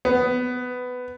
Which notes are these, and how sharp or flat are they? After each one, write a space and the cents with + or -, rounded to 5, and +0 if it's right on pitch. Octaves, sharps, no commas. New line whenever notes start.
B3 +15